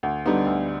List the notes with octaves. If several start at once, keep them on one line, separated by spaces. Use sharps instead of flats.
D2
D3 G3 B3 D#4
D2